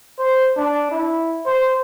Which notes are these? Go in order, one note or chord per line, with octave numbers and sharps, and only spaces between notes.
C5
D4
E4
C5